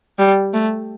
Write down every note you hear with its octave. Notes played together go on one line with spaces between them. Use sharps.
G3
A3